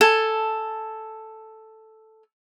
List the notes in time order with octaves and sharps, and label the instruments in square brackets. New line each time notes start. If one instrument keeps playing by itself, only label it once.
[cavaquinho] A4 G#5